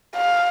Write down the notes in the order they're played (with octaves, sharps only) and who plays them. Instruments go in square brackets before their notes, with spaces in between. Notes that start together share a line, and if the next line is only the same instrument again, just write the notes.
[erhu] F5